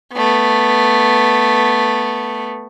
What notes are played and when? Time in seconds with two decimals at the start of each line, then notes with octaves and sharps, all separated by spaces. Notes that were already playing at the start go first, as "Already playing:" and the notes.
0.13 A3 B3